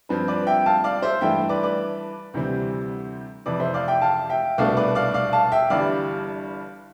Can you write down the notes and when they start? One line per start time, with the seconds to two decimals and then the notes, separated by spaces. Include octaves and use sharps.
0.09 G2 F3 C4 B4
0.28 B4 D5
0.47 E5 G5
0.66 F5 A5
0.84 D5 F5
1.02 C5 E5
1.21 G2 E3 A3 E5 G5
1.49 B4 D5
1.63 B4 D5
2.34 D2 C3 E3 G3 C4
3.46 F2 C3 E3 B4 D5
3.60 C5 E5
3.74 D5 F5
3.88 E5 G5
4.02 F5 A5
4.30 E5 G5
4.58 C2 B2 A3 D4 D5 F5
4.77 B4 D5
4.95 D5 F5
5.14 D5 F5
5.33 F5 A5
5.52 E5 G5
5.70 G1 G2 E3 G3 D5 F5